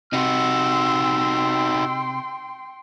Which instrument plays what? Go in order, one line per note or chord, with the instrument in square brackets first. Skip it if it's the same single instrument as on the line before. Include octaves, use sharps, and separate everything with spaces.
[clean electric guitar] C3 [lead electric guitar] D#4 F#4 [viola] G5 C6 [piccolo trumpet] E6